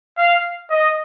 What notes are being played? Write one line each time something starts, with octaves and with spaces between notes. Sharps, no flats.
F5
D#5